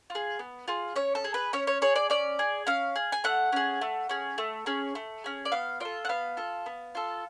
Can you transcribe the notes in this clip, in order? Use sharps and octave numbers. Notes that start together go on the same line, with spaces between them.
F4
G#4
B3
F4 G#4
C#4 C#5
A4
G#4
B4
C#4 C#5
C#5
G#4 C#5
D5
C#4 D5
G#4
C#4 F5
G#4
G#5
A3 F#5
C#4 G#4
A3
C#4 G#4
A3
C#4 G#4
A3
C#4 G#4
D5
B3 F5
F4 A4 D5
F#5
B3 F5
F4 A4
B3
F4 A4